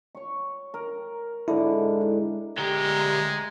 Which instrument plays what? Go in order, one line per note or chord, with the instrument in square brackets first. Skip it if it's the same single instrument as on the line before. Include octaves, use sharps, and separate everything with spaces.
[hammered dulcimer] C#5 C#6
A#4
[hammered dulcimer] G#2 D3 [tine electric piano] E4
[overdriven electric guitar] D2 G4 [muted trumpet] G#3 [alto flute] A#5